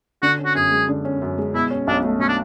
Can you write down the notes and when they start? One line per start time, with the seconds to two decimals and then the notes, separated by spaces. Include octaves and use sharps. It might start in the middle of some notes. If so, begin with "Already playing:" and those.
0.22 D3 F#4
0.39 C#4
0.45 F#4
0.55 F#2 G#4
0.71 G#3
0.88 D3
1.05 C#4
1.22 F#2
1.38 G#3
1.54 B2 E4
1.71 C#4
1.87 B1 D4
2.04 A3
2.20 B2 C#4
2.28 D4